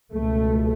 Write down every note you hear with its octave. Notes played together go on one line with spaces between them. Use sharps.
C#2 B2 A3